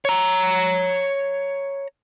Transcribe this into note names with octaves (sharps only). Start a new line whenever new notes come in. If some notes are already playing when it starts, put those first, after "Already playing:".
C#5 A#5